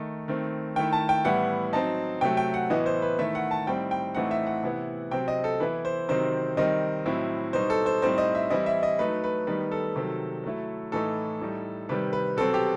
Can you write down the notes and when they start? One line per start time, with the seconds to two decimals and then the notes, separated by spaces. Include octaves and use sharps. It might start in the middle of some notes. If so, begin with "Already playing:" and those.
Already playing: D#3 A3 D#4
0.28 D#3 A3 C4
0.76 D#3 A3 E4 G5
0.93 A5
1.09 G5
1.24 A2 E3 G3 B3 E4 F#5
1.73 F#3 C4 D#4 A5
2.21 C3 F#3 A3 G5
2.37 G5
2.54 F#5
2.70 A2 E3 B3 E4 D#5
2.86 C5
3.02 B4
3.19 D#3 A3 E4 E5
3.35 F#5
3.51 A5
3.67 A2 G3 C4 D#4 G5
3.91 G5
4.15 A2 E3 A3 C4 D#4 F#5
4.31 E5
4.47 F#5
4.63 C3 E3 B3 E4
5.11 C3 F#3 C4 G5
5.28 D#5
5.44 A4
5.60 E3 B3 E4 B4
5.85 C5
6.09 C3 D#3 F#3 C4 D#4 C5
6.57 D#3 G3 C4 D#4 D#5
7.06 A2 F#3 C4 E4
7.53 B2 G3 D#4 C5
7.70 A4
7.86 C5
8.02 A2 G3 C4 D#4 C5
8.18 D#5
8.35 E5
8.50 E3 G3 C4 E4 D#5
8.66 E5
8.83 D#5
8.99 F#3 A3 D#4 B4
9.24 B4
9.47 D#3 G3 B3 D#4 B4
9.72 A4
9.96 C3 D#3 F#3
10.43 F#3 A3 E4
10.92 A2 E3 A3 D#4 A4
11.41 A2 G3 D#4
11.89 C3 D#3 G3 B4
12.13 B4
12.37 B2 F#3 C4 A4
12.54 G4